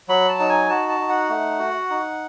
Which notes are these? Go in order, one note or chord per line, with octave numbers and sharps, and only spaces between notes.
F#3 B5
A5
D#4
G#5
F#4 A5
A5
D#4
F#5
A3
F#4
D#4